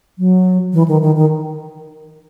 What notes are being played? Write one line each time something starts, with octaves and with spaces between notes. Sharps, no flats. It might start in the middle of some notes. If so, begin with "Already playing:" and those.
F#3
E3
D#3
D#3
D#3